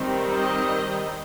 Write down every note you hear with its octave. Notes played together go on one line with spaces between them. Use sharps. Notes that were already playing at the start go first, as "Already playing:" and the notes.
Already playing: D#3 G3 C4
D#5